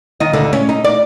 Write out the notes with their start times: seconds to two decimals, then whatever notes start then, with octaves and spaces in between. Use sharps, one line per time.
0.20 D#3 D#5
0.33 D2 D3
0.53 C#4
0.69 D#4
0.85 D5